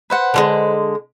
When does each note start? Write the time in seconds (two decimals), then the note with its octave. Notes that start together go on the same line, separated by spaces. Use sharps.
0.10 B4 C5 F#5
0.34 D3 G3 G#3